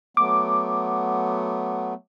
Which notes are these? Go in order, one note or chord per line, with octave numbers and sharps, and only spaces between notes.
F#3 A3 B3 D6